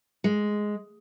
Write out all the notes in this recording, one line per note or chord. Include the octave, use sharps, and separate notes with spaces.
G#3